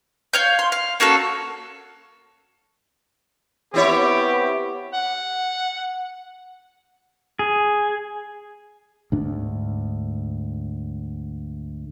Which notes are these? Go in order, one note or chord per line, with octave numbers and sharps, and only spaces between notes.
C#5 F5 G6
C6
F5
A#3 C#4 F#4 A4
B3 C4 E4 G4 C#5
F#5
G#4
D2 G#2 D4